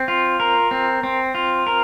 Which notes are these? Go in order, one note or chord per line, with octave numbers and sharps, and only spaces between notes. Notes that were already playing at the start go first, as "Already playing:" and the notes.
Already playing: C4
F4
A#4
C4
C4
F4
A#4